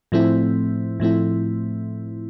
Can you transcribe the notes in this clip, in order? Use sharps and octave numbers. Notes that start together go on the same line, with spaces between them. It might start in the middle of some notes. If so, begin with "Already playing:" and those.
A2 F3 A3 C4 E4
A2 F3 A3 C4 E4